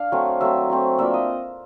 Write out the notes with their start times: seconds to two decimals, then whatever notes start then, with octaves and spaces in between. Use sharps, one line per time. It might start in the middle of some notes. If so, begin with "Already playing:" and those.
Already playing: D4 F5
0.12 F#3 A3 C4
0.40 F#3 A3 C4 E5
0.70 F#3 A3 C4
0.99 A#3 D4 F4 E5
1.14 D#5